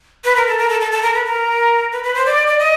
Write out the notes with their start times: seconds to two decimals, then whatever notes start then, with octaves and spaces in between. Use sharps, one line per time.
0.24 B4
0.36 A#4
0.47 A4
0.58 A#4
0.69 A4
0.81 A4
0.92 A4
1.03 A#4
1.14 B4
1.25 A#4
1.92 B4
2.04 B4
2.14 C5
2.26 D5
2.47 D5
2.59 D#5